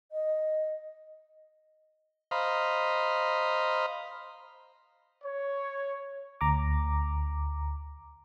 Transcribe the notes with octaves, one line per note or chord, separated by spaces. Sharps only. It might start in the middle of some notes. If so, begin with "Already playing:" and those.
D#5
C5 D#5 F5 A#5 B5
C#5
D2 A#5 D6